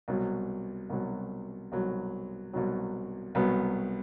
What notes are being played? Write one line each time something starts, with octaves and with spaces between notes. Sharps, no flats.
C2 B2 F#3
C2 B2 F#3
C2 B2 F#3
C2 B2 F#3
C2 B2 F#3 B3